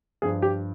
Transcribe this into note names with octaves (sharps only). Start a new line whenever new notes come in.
G2 F3 G#4
G4